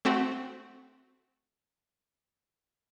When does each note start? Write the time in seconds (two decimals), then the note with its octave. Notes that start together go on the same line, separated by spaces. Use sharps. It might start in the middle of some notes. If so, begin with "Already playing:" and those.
0.05 A3 C4 F#4